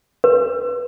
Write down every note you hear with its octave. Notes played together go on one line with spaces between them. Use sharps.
B4